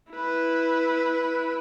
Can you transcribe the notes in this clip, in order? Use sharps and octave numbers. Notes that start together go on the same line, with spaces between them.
E4 B4